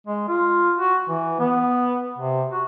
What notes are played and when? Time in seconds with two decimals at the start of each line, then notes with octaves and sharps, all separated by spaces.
0.07 G#3
0.28 F4
0.78 F#4
1.09 E3
1.39 B3
2.18 C3
2.52 F#4